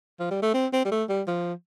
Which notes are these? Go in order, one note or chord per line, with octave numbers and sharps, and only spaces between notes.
F3
G3
A3
C4
C4
G3
A3
G3
F3